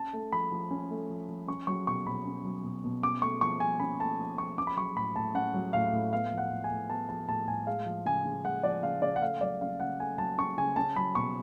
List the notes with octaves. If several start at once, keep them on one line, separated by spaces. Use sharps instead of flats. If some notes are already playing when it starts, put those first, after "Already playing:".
Already playing: C#4 A5
A3
F3 B5
F3
C#4
A3
F3
F3
C#4 C#6
F#3 C#6
B2 C#6
B2 B5
C#4
F#3
B2
B2
C#4 D6
A3 C#6
F3 C#6
F3 G#5
C#4 B5
A3 A5
F3
F3 C#6
C#4 D6
B5
F#3 C#6
A2 B5
A2 A5
C#4 F#5
F#3
A2 F5
A2
B3 F5
F3
F#5
A2
G#5
A2
B3 A5
F3 A5
A2 A5
A2 G#5
G#3 F5
F3
C#3 G#5
C#3
G#3 F#5
F3 D5
C#3 F5
C#3 D5
F#5
A3 F5
F#3 D5
C#4 F5
C#3 F#5
A3 G#5
F#3 A5
C#4 C#6
C#3 G#5
C#4 A5
F#3 B5
B2 C#6